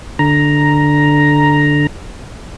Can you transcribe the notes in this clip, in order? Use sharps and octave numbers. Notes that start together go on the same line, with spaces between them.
D3 A#5